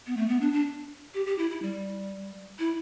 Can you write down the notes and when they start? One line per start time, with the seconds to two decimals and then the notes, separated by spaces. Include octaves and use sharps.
0.07 B3
0.17 A3
0.29 B3
0.41 D4
0.53 D4
1.14 G4
1.26 G4
1.38 E4
1.50 E4
1.62 G3
2.59 E4